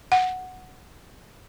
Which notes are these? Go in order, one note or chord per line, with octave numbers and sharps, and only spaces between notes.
F#5